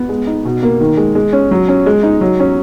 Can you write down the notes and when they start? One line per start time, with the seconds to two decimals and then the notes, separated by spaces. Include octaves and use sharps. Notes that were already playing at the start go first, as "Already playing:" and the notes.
Already playing: B3
0.09 G#3
0.27 D#4
0.45 B2
0.63 A#3
0.80 D#3
0.97 G#3
1.15 G#3
1.33 C#4
1.51 F#3
1.68 C#4
1.86 G#3
2.03 D#4
2.21 F#3
2.40 C#4